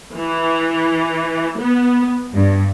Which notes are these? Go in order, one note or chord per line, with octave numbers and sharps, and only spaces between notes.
E3
B3
G2